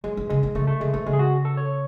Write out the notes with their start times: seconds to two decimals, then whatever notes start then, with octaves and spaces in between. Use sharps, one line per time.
0.04 F#3 G#3
0.17 E3
0.29 C#3 G#3
0.43 D#3
0.55 C#3 A3
0.67 A3
0.81 C#3 G#3
0.93 E3 A3
1.06 C#3 G#3
1.13 G#4
1.19 F#4
1.45 A4
1.57 C#5